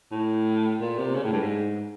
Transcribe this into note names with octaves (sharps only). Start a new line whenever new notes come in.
A2
A#2
C3
C#3
A2
G2
G#2